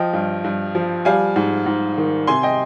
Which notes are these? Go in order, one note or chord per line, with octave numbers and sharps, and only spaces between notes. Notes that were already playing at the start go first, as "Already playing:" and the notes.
Already playing: F3 D#5 G5
G2
G2
F3
G3 F5 G#5
G#2
G#2
D#3
C3 G#5 C6
D#5 G5